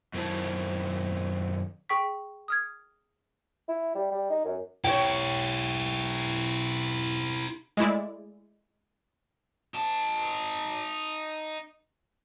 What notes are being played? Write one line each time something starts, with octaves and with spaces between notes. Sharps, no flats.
F#2 D#3 C4 E4 A5
G#4 G5 C#6 B6
D#6 F6 G#6
E4
G3
G3
D#4
F#2
E4 G4 C#5 G5
G#3 A3 E4 D5
D#4 A5